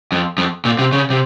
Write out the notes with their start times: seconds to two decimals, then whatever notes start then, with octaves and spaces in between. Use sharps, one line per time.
0.12 F2
0.38 F2
0.65 A#2
0.79 C3
0.92 C#3
1.10 C3